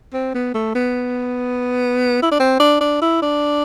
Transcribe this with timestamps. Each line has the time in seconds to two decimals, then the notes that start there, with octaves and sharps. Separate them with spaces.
0.13 C4
0.34 B3
0.54 A3
0.75 B3
2.23 E4
2.31 D4
2.39 C4
2.60 D4
2.81 D4
3.01 E4
3.22 D4